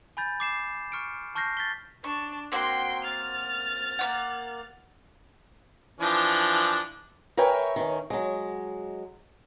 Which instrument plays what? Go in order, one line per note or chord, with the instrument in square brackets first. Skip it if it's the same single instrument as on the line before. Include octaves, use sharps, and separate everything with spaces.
[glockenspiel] G#5 B5 G6 A6
D6 C7 E7
C#6 F6 C#7 D7
A5 C#6 F6 G6 A#6 C7
A6 B6 G7
[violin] D4 A5 [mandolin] C#6
[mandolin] A#3 C4 F#4 [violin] G5 C6
[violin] F6 A6
[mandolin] A#3 C#4 F#5
[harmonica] E3 F3 D4
[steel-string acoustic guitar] A#4 B4 C#5 E5 G5 G#5
D#3 C#4
F#3 G#3